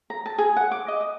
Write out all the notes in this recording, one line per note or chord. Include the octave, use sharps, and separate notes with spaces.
A#5
A5
G#4
F#5
D6
D#5
D#6